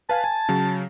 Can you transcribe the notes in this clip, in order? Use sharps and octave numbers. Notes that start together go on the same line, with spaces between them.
B4 F5 G#5 A5
G#5
C#3 F#3